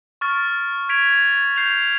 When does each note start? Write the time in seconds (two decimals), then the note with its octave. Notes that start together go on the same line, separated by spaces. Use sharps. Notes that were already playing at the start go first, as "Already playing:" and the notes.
0.21 C#6 F6 A6
0.89 G#6 B6 D7 F7
1.56 G6 C7 F7